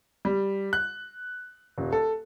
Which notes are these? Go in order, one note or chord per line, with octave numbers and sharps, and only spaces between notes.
G3
F#6
D#1
A4